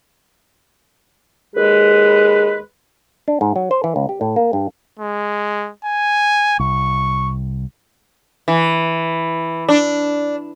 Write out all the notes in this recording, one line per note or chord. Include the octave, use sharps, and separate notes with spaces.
D#2 G#3 G#4 B4
D4
G#2
F#3
C5
E3
C#2
G4
A2
A#3
G2
G#3
G#5
C2 C#6
E3
D4